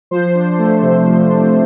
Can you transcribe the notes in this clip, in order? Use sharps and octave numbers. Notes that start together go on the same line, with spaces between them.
F3 C5
D4
A3
C3
F3
D4